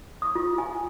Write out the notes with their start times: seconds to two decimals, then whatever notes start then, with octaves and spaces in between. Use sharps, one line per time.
0.22 D#6
0.35 F4
0.58 G#5